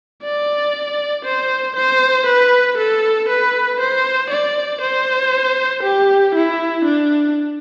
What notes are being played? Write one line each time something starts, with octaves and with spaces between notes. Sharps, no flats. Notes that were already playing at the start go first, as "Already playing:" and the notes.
D5
C5
C5
B4
A4
B4
C5
D5
C5
G4
E4
D4